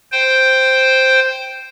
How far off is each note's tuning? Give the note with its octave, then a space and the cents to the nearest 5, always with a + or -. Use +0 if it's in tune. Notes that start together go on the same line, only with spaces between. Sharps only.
C5 +0 G5 +0